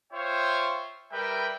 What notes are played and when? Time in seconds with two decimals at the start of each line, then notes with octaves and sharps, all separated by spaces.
0.13 F4 C5 C#5 E5 G5
1.12 G3 A#4 B4 E5 G5